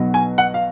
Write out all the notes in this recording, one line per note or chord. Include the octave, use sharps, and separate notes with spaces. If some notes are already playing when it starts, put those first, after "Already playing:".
Already playing: B1 B2 F#3 B3
G#5
F#5
F5